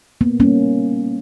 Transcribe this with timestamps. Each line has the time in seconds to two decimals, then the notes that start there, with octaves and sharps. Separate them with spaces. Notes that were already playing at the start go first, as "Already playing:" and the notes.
0.21 A#3 B3
0.40 G3 A#3 C#4